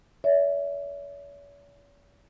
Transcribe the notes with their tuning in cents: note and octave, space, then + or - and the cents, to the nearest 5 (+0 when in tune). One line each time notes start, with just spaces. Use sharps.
C#5 +45 E5 -10